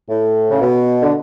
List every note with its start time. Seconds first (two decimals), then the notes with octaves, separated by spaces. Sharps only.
0.10 A2
0.50 C#3
0.62 B2
1.03 D3